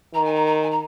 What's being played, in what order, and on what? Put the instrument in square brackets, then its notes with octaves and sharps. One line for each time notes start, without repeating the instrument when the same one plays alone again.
[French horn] D#3 [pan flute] A#5
[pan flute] G#5
A#5
A#5
G#5
A#5